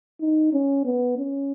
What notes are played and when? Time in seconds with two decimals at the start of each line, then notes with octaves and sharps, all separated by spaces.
0.21 D#4
0.53 C#4
0.85 B3
1.18 C#4